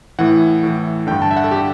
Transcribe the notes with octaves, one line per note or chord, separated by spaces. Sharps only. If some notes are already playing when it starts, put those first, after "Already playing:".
A2 E3 F#5
A2 E3
G2 D3 G5
A5
E5
F#5
A4
D3 G4